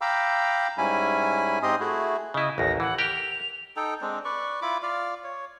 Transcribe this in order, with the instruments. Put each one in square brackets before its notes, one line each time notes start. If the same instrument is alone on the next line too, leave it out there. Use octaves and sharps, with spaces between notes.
[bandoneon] F5 G5 A#5 B5 D6 E6
G#2 G3 C#4 E4 G#5 B5
G#2 C4 G4 D#5 C6 D#6
A3 E4 F#4 G#4
[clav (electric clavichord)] C#3 E4 [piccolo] D#5
[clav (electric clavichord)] A1 D#2 [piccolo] A#6
[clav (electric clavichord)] E3 [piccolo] F#5
[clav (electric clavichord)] G4 A#4 G5 [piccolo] F7
[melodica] D#4 A4 G5
G#3 C4 D4
B4 D5 C#6
E4 F4 B5 D6
F4 D5 F5
C#5